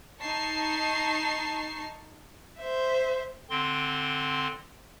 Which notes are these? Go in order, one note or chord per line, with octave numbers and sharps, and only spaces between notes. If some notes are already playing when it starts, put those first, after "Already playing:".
D#4 A5 C#6 C7
C5 E5
D3 C4 C6